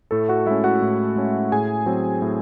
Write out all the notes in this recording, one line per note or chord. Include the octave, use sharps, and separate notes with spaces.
A2 A3 A4
F#4 F#5
G#3 C#4 E4 E5
F#4 F#5
A2
G#3 C#4
A2 G#4 G#5
F#3 C4
A2